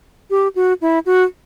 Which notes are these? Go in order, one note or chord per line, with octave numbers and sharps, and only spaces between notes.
G4
F#4
E4
F#4